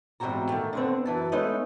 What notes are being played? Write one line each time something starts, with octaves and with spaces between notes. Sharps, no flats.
E2 G#2 G3 C4 F#4 A#5
D#3 F#3 A3
D3 B3 C4
F#2 E3 A5
G#3 A3 B3 C#4 D#4